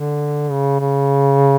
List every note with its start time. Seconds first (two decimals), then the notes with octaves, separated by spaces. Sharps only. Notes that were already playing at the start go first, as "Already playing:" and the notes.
Already playing: D3
0.51 C#3
0.80 C#3